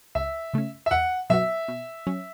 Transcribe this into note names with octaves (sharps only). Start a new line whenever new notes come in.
C#2 E5
C#3 A3 C#4
E5
E2 F#5
B2 F#3 B3 F#4 E5
B2
F#3 C#4